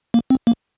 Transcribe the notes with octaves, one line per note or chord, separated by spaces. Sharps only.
A#3
C4
A#3